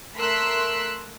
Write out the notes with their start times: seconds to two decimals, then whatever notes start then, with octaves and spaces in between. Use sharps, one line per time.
0.19 A3 A#4 C6 E6 F#6 B6